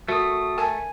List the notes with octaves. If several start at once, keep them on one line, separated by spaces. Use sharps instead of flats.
A3 F#4 A#4 D#6
A#4 G#5 A5